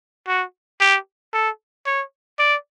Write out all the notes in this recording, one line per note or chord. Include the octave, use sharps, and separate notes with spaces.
F#4
G4
A4
C#5
D5